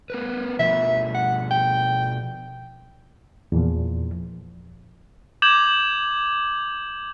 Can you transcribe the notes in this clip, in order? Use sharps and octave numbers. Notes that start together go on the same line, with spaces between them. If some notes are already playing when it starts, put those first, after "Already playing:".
B3 A#4 B4
B2 F3 E5
F#5
G5
E2 A#2 F3
D6 G6 G#6 E7 F#7